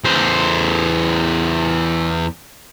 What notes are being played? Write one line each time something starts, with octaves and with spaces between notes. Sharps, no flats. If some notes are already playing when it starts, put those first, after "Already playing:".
E2 C5